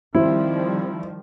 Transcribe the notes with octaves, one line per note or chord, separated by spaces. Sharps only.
D#3 F3 G3 C4 E4